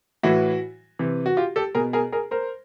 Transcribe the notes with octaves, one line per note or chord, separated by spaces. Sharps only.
A2 E3 E4 F#4
C3 E3
F#4
F4 G4
G4 A4
B2 G#4 A#4
G#4 A#4
G#4 A#4
A#4 C5